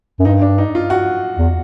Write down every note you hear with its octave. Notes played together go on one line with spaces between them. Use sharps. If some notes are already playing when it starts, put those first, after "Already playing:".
F#2
G2 D#4
D4
D#4
F4
F#4
E2